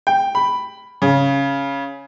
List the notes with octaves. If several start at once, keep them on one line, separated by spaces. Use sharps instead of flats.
G5
B5
C#3